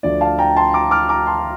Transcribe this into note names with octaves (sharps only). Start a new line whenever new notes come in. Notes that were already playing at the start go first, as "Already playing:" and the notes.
D2 D3 F3 D5
F5 A5
G5 A#5
A5 C6
A#5 D6
D6 F6
A#5 D6
A5 C6